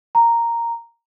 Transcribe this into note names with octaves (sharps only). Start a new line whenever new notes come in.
A#5